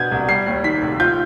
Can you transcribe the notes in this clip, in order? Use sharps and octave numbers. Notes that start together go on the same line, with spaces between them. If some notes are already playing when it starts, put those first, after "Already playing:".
Already playing: B2 B3 D4 G6 G#6
C2
G3 C7
D#2
D#3 B6
F1
F4 G6